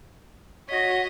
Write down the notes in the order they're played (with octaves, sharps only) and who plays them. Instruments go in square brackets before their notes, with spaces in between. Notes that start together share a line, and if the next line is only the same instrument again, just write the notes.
[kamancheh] F#4 C#5 [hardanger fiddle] D#5 [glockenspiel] A#6 B6